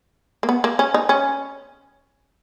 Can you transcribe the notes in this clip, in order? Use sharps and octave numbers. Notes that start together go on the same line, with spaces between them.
A#3
B3
A#3
C#4
D#4
C#4